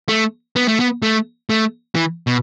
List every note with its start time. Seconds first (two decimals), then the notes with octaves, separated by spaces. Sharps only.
0.09 A3
0.56 B3
0.68 A3
0.80 B3
1.02 A3
1.50 A3
1.95 E3
2.27 B2